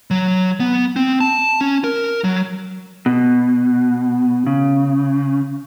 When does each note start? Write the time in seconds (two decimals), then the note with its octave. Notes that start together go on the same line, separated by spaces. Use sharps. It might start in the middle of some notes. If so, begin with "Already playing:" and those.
0.11 F#3
0.60 B3
0.96 C4
1.21 A5
1.61 C#4
1.84 A#4
2.24 F#3
3.06 B2
4.47 C#3